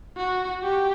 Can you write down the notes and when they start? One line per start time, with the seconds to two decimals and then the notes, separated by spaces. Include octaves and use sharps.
0.17 F#4
0.63 G4